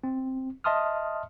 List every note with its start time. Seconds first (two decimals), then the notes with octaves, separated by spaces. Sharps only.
0.04 C4
0.64 D#5 E5 A5 C6 D#6 F6